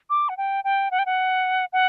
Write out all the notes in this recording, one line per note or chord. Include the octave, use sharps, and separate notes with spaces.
D6
F#5
G5
G5
F#5
G5
F#5
F#5